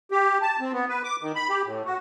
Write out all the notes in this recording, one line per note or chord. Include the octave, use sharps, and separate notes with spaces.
G4
A5
C4
B3
B4
D6
D#3
B5
G4
A2
F#4